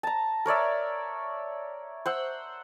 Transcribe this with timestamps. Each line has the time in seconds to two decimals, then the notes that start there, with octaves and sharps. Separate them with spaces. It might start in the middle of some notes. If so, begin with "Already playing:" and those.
0.03 A5 A#5
0.46 A#4 C#5 D5 E5
2.06 C5 F#5 E6